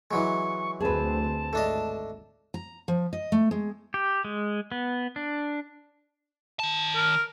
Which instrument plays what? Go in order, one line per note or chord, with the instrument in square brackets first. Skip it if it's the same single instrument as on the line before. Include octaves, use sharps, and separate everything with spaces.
[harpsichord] E3 F#3 G#3 [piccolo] C#6
[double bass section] D2 C4 [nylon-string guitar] G#4 B4 [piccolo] A5
[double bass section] G#1 [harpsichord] A3 D4 D#5
[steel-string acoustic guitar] A#5
F3
D#5
A3
G#3
[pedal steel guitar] G4
G#3
B3
D4
[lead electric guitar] D#3 A5
[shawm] A#4